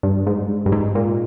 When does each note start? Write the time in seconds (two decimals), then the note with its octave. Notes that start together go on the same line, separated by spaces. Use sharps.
0.03 G2
0.27 G#2
0.66 G2
0.72 G#2
0.95 A#2